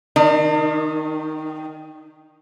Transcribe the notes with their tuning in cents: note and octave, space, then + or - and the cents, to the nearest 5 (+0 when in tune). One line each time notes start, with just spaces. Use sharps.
D#3 +0 D4 +45